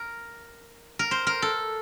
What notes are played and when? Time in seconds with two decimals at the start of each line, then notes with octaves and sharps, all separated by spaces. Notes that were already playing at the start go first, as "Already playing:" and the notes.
Already playing: A#4
0.99 A#4
1.11 C5
1.27 A#4
1.42 A4